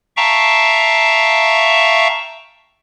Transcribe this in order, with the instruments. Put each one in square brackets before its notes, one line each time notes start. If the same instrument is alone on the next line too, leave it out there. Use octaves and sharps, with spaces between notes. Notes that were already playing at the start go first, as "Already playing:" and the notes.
[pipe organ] E5 F5 G5 A5 A#5 C#6